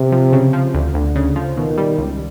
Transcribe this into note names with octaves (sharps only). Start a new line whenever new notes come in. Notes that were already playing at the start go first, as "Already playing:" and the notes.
Already playing: C3
F3
C#3
F3
D2
D2 D3
C#3
F3
B2 D#3
G3
C#2